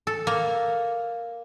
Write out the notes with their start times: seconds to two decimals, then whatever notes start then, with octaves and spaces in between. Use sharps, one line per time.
0.07 A4
0.27 A#3